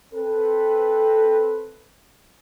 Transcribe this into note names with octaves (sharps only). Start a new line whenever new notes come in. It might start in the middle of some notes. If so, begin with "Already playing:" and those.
C4 A4 B4